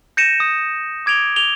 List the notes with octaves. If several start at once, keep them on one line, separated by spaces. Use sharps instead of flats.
G6 A#6 C#7 D#7 E7
D#6
D6 G#6 D7 F7 G7
F7 G7